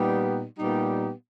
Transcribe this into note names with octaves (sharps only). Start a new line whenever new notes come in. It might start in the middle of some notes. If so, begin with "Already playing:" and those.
Already playing: A#2 G3 B3 D#4 G4
A#2 G3 B3 D#4 G4